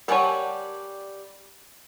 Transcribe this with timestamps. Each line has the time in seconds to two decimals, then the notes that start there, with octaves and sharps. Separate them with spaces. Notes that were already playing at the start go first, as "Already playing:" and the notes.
0.08 G3 G4 A#4 C#5 D5 F#5 G#5 A5